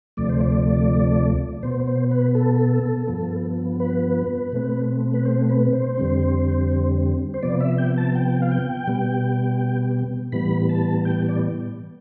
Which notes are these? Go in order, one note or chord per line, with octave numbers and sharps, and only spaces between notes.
D2 C3 F3 A3 D5
C5
D5
B2 B3 C5
C5
B4
A4
G2 F3 B3
B4
B2 A3 C4
B4
C5
B4
C5
F2 D3 G3 C4
C5
C3 F3 B3 D5
E5
G5
A5
G5
F5
G5
B2 G3 B3
A2 E3 G3 B3 B5
A5
G5
D5